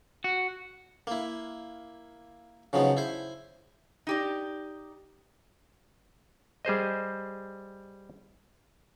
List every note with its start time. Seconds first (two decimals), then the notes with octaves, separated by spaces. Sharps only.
0.24 F#4
1.07 A#3 E4
2.73 C#3 F3 F#3 B3 D#4
2.97 E4 C5
4.07 D#4 G4 D5
6.65 G3 G#4 C5 D#5